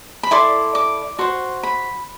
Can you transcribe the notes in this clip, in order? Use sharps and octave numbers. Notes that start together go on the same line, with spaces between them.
B5
E4 A4 D5 C6
D6
F#4 C5 C6
B5